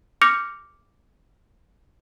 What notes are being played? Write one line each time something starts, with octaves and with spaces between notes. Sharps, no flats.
D6 F6 G6 A#6 C#7 F7